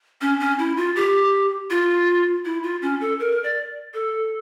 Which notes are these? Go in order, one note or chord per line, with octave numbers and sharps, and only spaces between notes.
C#4
C#4
E4
F4
G4
F4
E4
F4
C#4
A4
A#4
D5
A4